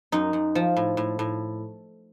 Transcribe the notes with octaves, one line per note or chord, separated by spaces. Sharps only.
F#2 D#4
F#2
F3
A2
A2
A2